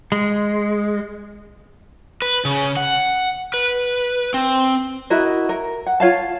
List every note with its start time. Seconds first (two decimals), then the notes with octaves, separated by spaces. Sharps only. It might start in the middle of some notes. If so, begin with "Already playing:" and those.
0.12 G#3
2.22 B4
2.45 C#3
2.77 F#5
3.54 B4
4.34 C4
5.10 E4 F#4 A#4 D#5
5.49 A#4
5.86 F#5
6.00 F4 C#5 F5 A5